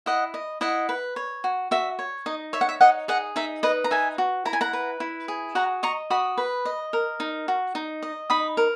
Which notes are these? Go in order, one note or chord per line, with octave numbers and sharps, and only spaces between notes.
E4 D#5 F#5
D#5
E4 D#5 F#5
B4
C#5
F#4
F#4 E5
C#5
D#4 D#5
C#5 E5
F#5
E5
D#4 D#5 F#5
G#4 D#5 F#5
D#4 E5
B4 D#5
A#5
D#4 E5 G#5
F#4
E4 A#5
G#5
F#5 A#5
B4
E4
G#4
F#4 F#5 A#5
D#5 A#5 C#6
F#4 B5 D#6
B4
D#5
A#4
D#4
F#4
D#4
D#5
D#4 B5 D#6
A#4